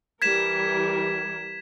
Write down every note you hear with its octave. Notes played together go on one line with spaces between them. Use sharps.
E3 G3 A#4 G#6 B6 E7